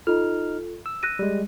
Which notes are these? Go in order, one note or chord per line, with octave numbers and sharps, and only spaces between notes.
D#4 F4 A4 F6
E6
F#6 A#6 D#7
G3 G#3